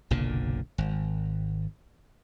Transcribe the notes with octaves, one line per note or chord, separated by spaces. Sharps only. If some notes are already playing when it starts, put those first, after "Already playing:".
F#1 B1 A#2 D3
G#1